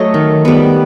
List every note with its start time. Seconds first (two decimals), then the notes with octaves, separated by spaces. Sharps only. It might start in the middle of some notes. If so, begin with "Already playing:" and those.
Already playing: F#3 A3 C#5 D#5
0.14 D#3
0.45 G3 B3